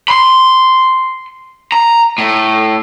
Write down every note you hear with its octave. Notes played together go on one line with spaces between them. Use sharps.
B5 C6
A#5
A2